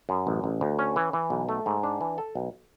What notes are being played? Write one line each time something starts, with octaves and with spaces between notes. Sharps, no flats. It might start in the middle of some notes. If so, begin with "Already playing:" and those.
F#2
A1
A1
D2
C#4
E3
E3
B1
A3
G#2
D4
E3
A4
B1